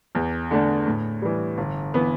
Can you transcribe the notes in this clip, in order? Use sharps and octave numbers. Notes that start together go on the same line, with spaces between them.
E2
D3 A3 D4
A2
E3 G3
G1
E3 B3